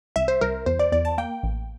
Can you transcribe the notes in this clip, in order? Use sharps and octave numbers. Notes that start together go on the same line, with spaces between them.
C2 E5
C5
C2 A#4
E2 C5
D5
E2 D5
A5
A#3 G5
A1